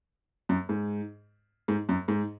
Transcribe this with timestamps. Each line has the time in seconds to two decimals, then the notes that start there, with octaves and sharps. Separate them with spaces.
0.49 F#2
0.69 G#2
1.68 G#2
1.89 F#2
2.08 G#2